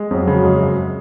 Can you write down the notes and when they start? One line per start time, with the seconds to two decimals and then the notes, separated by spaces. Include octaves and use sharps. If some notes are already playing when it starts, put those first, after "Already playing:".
Already playing: G#3
0.10 F2 F#3
0.27 C#3
0.44 G#3
0.61 F#2